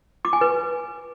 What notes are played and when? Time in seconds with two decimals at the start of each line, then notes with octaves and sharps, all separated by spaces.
0.25 D6
0.33 G#5
0.41 B4